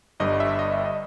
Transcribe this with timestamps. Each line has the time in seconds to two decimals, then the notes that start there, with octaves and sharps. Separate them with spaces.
0.20 G1 G2 G3 D#5
0.40 E5
0.59 D#5
0.72 E5
0.86 D#5